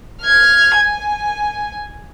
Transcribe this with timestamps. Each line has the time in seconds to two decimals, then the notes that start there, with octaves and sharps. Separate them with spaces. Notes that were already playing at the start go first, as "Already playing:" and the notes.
0.23 F6 G#6
0.76 G#5